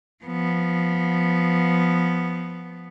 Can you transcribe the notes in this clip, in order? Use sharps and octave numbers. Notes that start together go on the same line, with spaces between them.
F3 B3